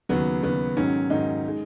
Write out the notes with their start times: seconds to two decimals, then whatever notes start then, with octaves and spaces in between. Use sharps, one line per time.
0.09 D#2 C#3 F#3 B3
0.42 D#2 C#3 F#3 B3
0.77 G#2 D#3 F#3 C#4
1.10 G#2 D#3 F#3 D#4
1.48 G#3